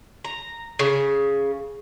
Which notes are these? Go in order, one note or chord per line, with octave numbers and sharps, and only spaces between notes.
A#5
C#3